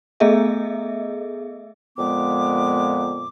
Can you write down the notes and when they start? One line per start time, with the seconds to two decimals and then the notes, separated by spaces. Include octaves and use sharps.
0.20 A3 B3 G#4 A4 D#5 E5
1.97 F2 A#2 G#3 B3 D6